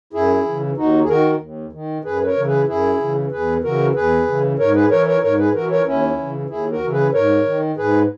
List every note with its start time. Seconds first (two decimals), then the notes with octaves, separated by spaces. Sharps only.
0.13 F#2 E4 G#4
0.45 C#3 E3
0.77 D#2 D#4 F#4
1.04 G#4
1.08 D#3 F#4 A#4
1.40 D#2
1.73 D#3
2.04 F#2 G#4 B4
2.21 B4
2.26 A#4 C#5
2.36 C#3 E3
2.47 G#4 B4
2.68 F#2 E4 G#4
3.01 C#3 E3
3.31 E2 G#4 B4
3.64 C#3 E3 F#4 A#4
3.95 E2 G#4 B4
4.27 C#3 E3
4.59 G#2 A#4 C#5
4.75 G#4 B4
4.90 E3 A#4 C#5
5.06 A#4 C#5
5.22 G#2 A#4 C#5
5.38 G#4 B4
5.54 E3 F#4 A#4
5.70 A#4 C#5
5.86 D#2 C#4 E4
6.18 C#3 E3
6.49 D#2 E4 G#4
6.71 F#4 A#4
6.82 C#3 E3
6.92 G#4 B4
7.13 G#2 A#4 C#5
7.46 D#3
7.77 G#2 G#4 B4